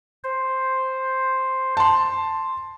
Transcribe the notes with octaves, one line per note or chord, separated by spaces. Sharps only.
C5
A5 C6